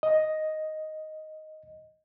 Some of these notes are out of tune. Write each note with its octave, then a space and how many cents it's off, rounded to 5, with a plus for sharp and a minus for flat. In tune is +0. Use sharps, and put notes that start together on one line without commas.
D#5 +5